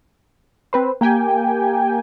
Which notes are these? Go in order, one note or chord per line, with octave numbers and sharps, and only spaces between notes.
C4 B4 C5
A#3 G4 G5 G#5